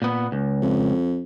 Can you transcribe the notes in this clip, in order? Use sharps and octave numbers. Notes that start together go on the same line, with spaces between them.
A#2 B3
C#2
F2